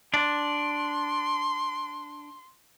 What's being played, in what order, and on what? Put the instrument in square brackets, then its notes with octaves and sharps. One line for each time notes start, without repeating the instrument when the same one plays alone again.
[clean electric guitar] D4 [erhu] C6